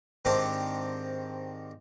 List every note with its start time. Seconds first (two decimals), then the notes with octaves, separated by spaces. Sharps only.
0.25 G#2 D#3 C4 D4 G4